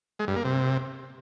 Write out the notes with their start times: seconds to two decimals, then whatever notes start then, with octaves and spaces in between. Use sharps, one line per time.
0.19 G#3
0.28 G2
0.36 A#3
0.45 C3